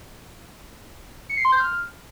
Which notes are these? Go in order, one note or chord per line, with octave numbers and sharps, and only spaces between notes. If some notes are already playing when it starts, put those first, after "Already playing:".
C#7
C7
C6
G6
F6